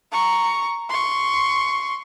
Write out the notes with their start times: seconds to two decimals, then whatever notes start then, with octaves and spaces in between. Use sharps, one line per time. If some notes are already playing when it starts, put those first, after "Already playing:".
0.12 A#5 C#6
0.89 C6 C#6